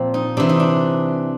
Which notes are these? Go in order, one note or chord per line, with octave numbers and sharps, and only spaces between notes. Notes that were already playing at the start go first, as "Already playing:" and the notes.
Already playing: A#2 F3 C4
D#4
C3 E3 D4
D#4
D4